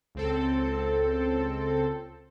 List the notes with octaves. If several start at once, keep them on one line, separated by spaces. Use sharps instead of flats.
C#2 C4 A4